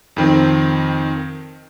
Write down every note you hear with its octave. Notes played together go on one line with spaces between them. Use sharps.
F2 D#3 C4